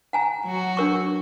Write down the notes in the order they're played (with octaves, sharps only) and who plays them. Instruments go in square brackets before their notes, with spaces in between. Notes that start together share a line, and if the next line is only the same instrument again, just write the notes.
[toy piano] F#5 G#5 A#5
[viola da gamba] F#3 F#4
[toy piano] D4 A#4 C#6